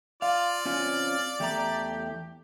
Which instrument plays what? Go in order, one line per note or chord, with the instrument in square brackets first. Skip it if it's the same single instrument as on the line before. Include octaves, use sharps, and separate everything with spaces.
[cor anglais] F4 [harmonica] D5 [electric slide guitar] F5
[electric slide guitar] C4 C#4 F4 [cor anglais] F5
[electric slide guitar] E2 A3 A#5 [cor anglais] G4